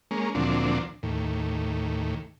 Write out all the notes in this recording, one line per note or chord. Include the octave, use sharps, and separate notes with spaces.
G#3 A#3 C#4
D2 A#2 F3 F#3 C4 D4
D#2 A2